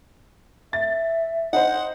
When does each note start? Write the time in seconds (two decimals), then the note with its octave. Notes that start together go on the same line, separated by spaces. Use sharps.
0.73 E5 A6
1.53 D#4 C5 F#5